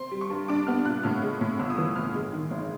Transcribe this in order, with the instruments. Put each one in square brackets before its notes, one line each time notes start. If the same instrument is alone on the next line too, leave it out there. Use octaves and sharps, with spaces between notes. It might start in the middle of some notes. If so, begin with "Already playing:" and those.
Already playing: [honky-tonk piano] C4 C6
G3
C#6
G2
D4 D6
B3 F6
A#2 F#6
A2 F6
G#3
A2
G1 E6
D#6
E3 E6
G1 F6
G#3
D#3
A1